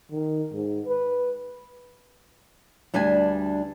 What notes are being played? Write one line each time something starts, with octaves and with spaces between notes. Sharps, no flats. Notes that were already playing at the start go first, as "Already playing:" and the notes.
D#3
G#2
B4
D2 G3 D4 B4 G#5